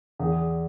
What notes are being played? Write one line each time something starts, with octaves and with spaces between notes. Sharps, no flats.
E2 G#4